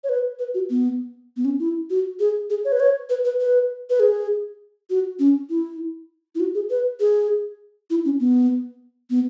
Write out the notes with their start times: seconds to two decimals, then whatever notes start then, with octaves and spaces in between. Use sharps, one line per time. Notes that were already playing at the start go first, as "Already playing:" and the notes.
0.04 C#5
0.09 B4
0.39 B4
0.54 F#4
0.70 B3
1.37 B3
1.45 C#4
1.59 E4
1.90 F#4
2.20 G#4
2.50 G#4
2.65 C#5
2.72 B4
2.80 C#5
3.10 B4
3.25 B4
3.40 B4
3.90 B4
4.00 G#4
4.90 F#4
5.19 C#4
5.50 E4
6.35 E4
6.40 F#4
6.55 G#4
6.70 B4
7.00 G#4
7.90 E4
8.05 C#4
8.20 B3
9.10 B3